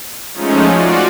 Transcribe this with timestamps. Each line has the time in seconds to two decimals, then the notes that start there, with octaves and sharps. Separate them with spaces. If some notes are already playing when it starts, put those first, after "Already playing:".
0.35 F3 G#3 A3 C#4 D#4
0.70 F4 F#4 D5